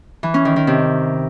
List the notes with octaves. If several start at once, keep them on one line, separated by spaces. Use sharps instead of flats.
E3
C#4
D#3
D#3
C3